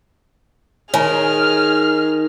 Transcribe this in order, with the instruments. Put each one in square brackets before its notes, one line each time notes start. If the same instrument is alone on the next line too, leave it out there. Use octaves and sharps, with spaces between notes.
[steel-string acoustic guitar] D#3 [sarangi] G#4 [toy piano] C#5 G#5 A#5 [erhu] F6